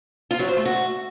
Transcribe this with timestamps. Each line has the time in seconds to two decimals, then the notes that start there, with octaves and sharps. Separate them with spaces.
0.31 F4
0.39 F#3
0.48 C5
0.57 A3
0.65 F#4